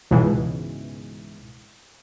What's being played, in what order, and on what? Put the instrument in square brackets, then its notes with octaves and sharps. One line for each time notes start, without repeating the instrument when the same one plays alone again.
[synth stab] C#2 G#2 B2 E3